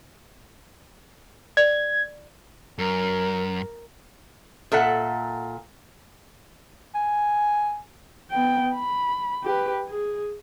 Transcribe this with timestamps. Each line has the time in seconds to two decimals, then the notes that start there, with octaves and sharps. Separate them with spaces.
1.57 D5 G#6
2.78 F#2 A#4
4.72 A#2 A4 E5 F#5
6.95 G#5
8.31 B3 G5
8.75 B5
9.44 G4 B4
9.88 G#4